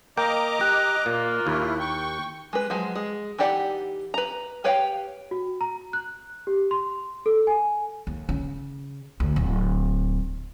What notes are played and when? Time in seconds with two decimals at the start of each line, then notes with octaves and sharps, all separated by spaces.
0.17 A#3 A#4 D#5 G5 A#5 D6
0.61 G4 F#6
1.06 A#2 A#3 F4
1.47 D#2 E4
1.80 G5 C#6
2.53 G#3 B4
2.70 F3 F#3 G#3
2.96 G#3
3.38 E3 D#4 G4 D5 F#5
4.14 B4 A#5
4.64 G4 B4 C#5 F5 G5
5.31 F#4
5.61 A#5
5.93 F#6
6.47 G4
6.71 C6
7.26 A4
7.47 G#5
8.07 D#2
8.29 C#3
9.20 D2
9.36 D1